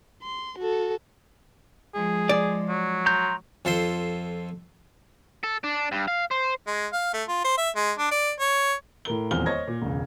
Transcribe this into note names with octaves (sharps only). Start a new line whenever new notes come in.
C6
F#4 A4
F3 G#3 G#4
D5
F#3
A#5 C6 G6
F2 F4 A4 C5 C6
A4
D4
G2
F5
C5
G#3
F5
A3
F4
C5
E5
G#3
D4
D5
C#5
A2 A#4 G7
D#1 E2 F3 C4 F6 G7
C5 C#5 D#5 G#6 A#6
A#2
E1 C#2